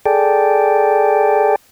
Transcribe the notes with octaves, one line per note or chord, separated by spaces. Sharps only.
G#4 A4 D5 G5